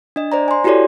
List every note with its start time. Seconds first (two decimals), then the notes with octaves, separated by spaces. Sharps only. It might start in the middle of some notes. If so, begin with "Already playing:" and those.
0.16 D4 D#5
0.32 C5 D5 A#5
0.48 G#5 C6
0.64 E4 F#4 G4 A4 C#5 D5